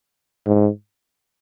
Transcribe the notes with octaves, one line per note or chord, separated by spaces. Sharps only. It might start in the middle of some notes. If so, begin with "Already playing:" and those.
G#2